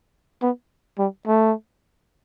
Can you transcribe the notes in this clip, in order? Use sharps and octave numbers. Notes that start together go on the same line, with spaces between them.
B3
G3
A3